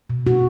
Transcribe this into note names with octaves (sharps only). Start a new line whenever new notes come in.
B2
B2 F#4